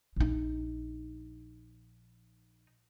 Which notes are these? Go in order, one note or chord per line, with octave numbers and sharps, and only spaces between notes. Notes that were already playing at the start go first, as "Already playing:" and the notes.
A#1 D#4